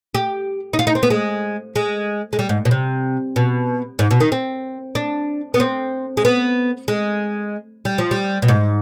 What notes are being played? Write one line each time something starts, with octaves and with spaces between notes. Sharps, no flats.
G4
D#4
F4
D#4
C4
B3
G#3
G#3
G#3
G3
G#2
B2
C3
B2
G#2
B2
D#3
C4
D4
B3
C4
G#3
B3
G#3
G3
F3
G3
B2
G#2